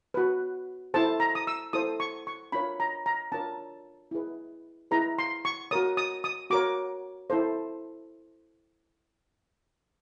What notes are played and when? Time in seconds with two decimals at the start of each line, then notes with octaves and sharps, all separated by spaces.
0.14 F#4 B4
0.94 E4 A4 C5 A5
1.20 A#5
1.35 D#6
1.47 E6
1.73 E4 A4 C5 D#6
2.00 C#6
2.27 C#6
2.52 D4 F4 A#4 C#5 B5
2.80 A#5
3.06 A#5
3.32 D4 F4 A#4 C#5 A5
4.11 E4 G#4 B4
4.91 E4 G#4 B4 A#5
5.19 C6
5.45 C#6
5.71 F#4 A#4 C#5 D#6
5.97 D#6
6.24 D#6
6.50 F#4 A#4 C#5 D6
7.30 E4 A4 C5